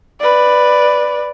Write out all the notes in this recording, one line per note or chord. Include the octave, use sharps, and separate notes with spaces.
B4 D5